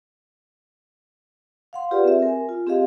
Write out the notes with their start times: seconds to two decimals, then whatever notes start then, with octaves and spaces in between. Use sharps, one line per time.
1.73 F5 F#5 C6
1.91 F4 G4 G#4 B4 D5
2.04 C4 E5
2.22 A#4 G#5
2.49 F4
2.67 C4 G4 G#4 D#5 F5